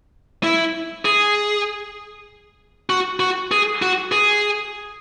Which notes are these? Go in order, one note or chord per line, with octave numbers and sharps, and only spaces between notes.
E4
G#4
F#4
F#4
G#4
F#4
G#4